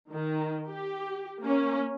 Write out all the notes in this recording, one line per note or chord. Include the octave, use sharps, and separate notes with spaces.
D#3
G4
A#3 C#4